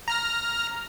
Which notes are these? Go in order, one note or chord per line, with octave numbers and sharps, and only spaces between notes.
A#5 F6 A#6